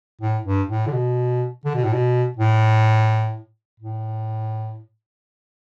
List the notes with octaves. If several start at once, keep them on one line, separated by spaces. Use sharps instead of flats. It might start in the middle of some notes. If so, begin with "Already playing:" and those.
A2
G2
A2
D3
B2
D3
B2
A2
B2
A2
A2